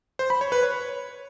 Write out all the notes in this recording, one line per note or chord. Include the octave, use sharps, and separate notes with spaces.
C5
B5
C#5
B4
C#5